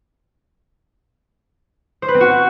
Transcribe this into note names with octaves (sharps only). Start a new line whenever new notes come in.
C5
B4
C4
F#4